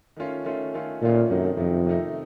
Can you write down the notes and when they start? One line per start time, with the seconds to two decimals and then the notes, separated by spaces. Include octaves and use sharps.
0.17 D#3 A3 C#4 F4
0.45 D#3 A3 C#4 F4
0.74 D#3 A3 C#4 F4
1.02 A#2 D#3 A3 C#4 F4
1.30 F#2 C3 D#3 A3 D#4
1.57 F2 C3 D#3 A3 D#4
1.86 C3 D#3 A3 D#4